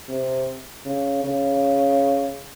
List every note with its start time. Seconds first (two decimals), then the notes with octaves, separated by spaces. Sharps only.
0.09 C3
0.86 C#3
1.24 C#3